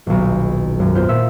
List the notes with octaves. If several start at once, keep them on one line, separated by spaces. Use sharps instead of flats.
D#1 B1
G#1 F#2
B3 F4 C5 G6
A#2 E5 E6 C#7